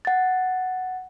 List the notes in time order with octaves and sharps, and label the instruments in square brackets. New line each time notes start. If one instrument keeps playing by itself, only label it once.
[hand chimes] F#5 A6